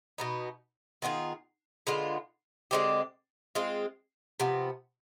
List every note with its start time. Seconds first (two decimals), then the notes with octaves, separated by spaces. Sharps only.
0.18 B2 B3 D#4
1.02 D#3 B3 F4 G#4
1.87 D3 G#3 B3 F4
2.71 D3 G#3 C4 G4
3.55 G#3 C4 F4
4.40 C3 F3 B3